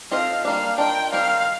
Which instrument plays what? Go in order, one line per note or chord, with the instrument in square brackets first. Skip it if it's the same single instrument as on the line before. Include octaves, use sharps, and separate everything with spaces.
[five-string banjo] C4 F4 A4 C5 D#5 [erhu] F5
[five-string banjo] G3 A#3 D4 [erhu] F5
[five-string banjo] D4 F4 A#4 D#5 [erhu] G5
[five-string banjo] D#3 G3 C4 G4 A#4 [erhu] F5